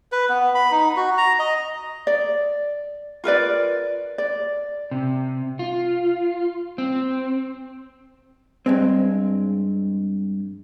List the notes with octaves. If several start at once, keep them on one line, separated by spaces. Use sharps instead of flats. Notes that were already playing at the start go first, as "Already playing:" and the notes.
B4
B3
B5
D#4
F#4
A#5
D#5
D5
F4 A#4 B4 D5
D5
C3
F4
C4
G2 G#3 C4